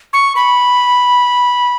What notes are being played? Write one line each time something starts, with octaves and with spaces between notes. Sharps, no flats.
C#6
B5